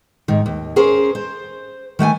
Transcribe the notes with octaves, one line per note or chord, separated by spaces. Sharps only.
G#2 D#3
D#2
C#4 G#4 A#4 C5
C5
D#3 A3 G5 G#5